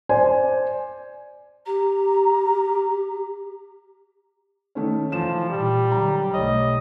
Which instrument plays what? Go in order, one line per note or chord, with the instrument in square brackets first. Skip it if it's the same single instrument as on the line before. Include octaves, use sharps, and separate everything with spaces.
[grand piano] C5 D5 G#5
[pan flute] G4 [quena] A#5
[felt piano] D#3 A3 C#4
[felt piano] E3 A5 E7 [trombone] F3
[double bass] A#2 [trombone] G3
[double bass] D3 F#3 [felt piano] A#5
[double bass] B1 A3 [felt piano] C#5 [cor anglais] D#5